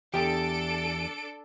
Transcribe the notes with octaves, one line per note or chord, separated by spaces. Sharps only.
E2 D4 G4 A4 D7